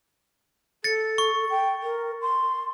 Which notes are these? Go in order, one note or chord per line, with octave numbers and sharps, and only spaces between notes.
A4 A6 C#7
C#6
G5
A#4
C6